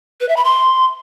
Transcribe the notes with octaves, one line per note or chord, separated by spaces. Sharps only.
B4
E5
B5
C6